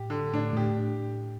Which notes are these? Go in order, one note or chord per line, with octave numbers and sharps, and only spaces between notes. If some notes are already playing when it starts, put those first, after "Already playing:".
Already playing: A2 G4
D3
A2 D4
A2 G4